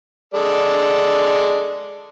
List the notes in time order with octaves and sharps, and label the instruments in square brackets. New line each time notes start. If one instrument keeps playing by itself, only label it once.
[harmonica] G#3 A4 D5